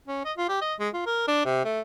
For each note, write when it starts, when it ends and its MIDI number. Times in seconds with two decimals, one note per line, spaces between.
0.08 0.23 61
0.25 0.33 75
0.38 0.49 65
0.49 0.60 67
0.62 0.74 75
0.80 0.89 56
0.94 1.03 65
1.07 1.27 70
1.28 1.44 62
1.45 1.65 48
1.65 1.81 57